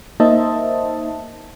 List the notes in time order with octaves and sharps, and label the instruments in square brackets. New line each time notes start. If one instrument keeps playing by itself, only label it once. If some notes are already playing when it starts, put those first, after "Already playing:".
[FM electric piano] A#3 D#4 C5 D#5 E5 A5